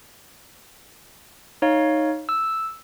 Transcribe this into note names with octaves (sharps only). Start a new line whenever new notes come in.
D#4 C#5 F5
E6